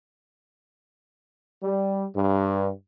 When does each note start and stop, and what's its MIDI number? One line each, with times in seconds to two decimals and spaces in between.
1.63 2.05 55
2.16 2.69 43